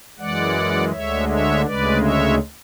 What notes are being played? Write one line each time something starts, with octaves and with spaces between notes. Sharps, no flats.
F#2 E3 G#3 D5 F#5
D2 D3 G#3 C#5 E5
C#5 E5
D2 C#3 G#3 B4 D5
C#5 E5